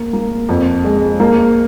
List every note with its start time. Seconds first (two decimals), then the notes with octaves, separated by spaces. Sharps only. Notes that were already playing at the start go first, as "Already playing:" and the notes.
Already playing: A#3
0.13 A#3
0.49 F2
0.84 G#3
1.20 A#3